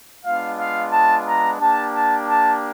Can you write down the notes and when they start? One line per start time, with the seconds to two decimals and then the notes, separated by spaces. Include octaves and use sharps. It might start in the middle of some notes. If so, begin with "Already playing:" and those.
0.24 G#3 B3 D4 F4 F5
0.59 F5
0.91 A5
1.26 A#5
1.60 A#3 D4 G4 A5
1.93 A5
2.28 A5